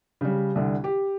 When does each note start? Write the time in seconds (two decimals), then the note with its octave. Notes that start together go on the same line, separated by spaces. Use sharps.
0.21 C#3 G3
0.55 C2 D3
0.84 G4